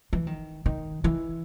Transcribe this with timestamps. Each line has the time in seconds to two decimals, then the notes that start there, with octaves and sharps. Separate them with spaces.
0.13 E3
0.27 D#3
0.66 D#3
1.04 E3